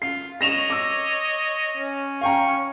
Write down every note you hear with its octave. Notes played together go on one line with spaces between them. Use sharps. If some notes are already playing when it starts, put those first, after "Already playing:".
F4 C7
C#5 D#5 A#6 E7 F7
D6 E6
C#4
F5 G5 A#5 C#6